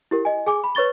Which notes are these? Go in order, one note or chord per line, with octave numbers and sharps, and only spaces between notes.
E4 G4 A#4
D#5 G#5
G#4 G#5 D6
B5
B4 C#5 C#6 A6 G7